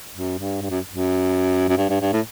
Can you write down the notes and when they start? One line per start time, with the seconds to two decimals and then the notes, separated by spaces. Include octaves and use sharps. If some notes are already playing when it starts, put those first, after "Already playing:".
0.14 F#2
0.39 G2
0.62 G2
0.70 F#2
0.89 F#2
1.69 F#2
1.77 G2
1.89 G2
2.01 G2
2.12 A2